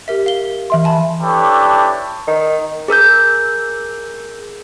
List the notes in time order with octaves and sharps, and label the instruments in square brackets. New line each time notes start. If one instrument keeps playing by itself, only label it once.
[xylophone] G4 A#4 E5
F5 G7
[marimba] E3 E5 C6
[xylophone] G#5 A5 B5
[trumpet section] D4 E4 G4 A4 B4 C#5
[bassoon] D#3
[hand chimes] G#4 A#4 E6 G6